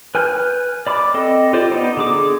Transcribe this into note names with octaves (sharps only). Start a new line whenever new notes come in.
B4 G#5 F6 G6
D5 B5 D6
C4 A4 D#5
F4 G4 C5 D5
B3 D#4 D5
D3 G#4 D6